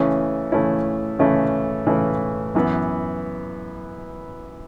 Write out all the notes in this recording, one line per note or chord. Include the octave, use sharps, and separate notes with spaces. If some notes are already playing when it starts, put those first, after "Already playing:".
Already playing: C#3 E3 A3 C#4 E4
C#3 E3 A3 C#4 E4
C#3 E3 A3 C#4 E4
C#3 E3 A3 C#4 E4
F#2 E3 B3